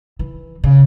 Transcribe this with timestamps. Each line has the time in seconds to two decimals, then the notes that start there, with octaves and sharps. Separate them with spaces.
0.19 E3
0.64 C#3